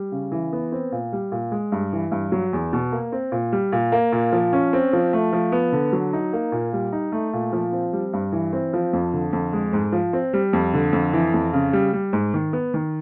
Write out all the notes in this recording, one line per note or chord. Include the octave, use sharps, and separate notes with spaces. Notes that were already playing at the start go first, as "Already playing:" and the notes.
Already playing: G3
C#3
E3
B3
C4
A#2
G3
A#2
G#3
G2
E3
G2
F#3
E2
B2
A#3
C4
A#2
G3
A#2
A#3
A#2
F3
C#4
C4
F3
A3
F3
B3
D3
F#3
D#4
A#3
A#2
G3
D#4
A3
A#2
F3
C4
G3
G2
E3
C4
F3
F2
D3
F2
G#3
G#2
F3
C4
G3
F2
D3
F2
E3
F2
C#3
G3
G3
G#2
D#3
B3
D#3